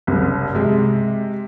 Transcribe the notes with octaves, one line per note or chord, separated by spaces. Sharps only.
F#1 C2
C3 G#3